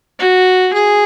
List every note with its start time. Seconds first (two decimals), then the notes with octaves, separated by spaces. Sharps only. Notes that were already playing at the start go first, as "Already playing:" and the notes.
0.19 F#4
0.73 G#4